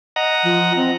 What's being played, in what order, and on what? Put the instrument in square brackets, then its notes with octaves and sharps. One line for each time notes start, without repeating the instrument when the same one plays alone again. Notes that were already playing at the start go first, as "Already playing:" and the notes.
[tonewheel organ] D#5 F#5 A#5
[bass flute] F3
C4